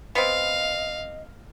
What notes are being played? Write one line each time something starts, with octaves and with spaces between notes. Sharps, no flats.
B3 C4 D#5 F5